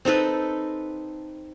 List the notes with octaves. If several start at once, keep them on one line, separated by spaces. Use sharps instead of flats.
C4 D#4 A4 B4